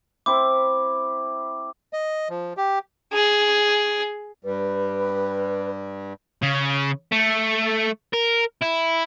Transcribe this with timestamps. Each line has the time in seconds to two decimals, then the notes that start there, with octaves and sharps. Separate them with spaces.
0.26 C4 E4 D6
1.93 D#5
2.29 F3
2.57 G4
3.13 G#4
4.45 G2 G3 B4
6.42 C#3
7.12 A3
8.13 A#4
8.62 E4